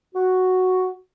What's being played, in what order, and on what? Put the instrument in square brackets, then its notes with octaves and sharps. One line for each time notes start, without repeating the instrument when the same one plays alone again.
[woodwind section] F#4